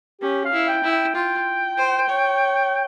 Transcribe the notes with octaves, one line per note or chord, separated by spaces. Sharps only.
C#4 G4
F5
E4
G5
E4
G5
F4 G5
C5
C#5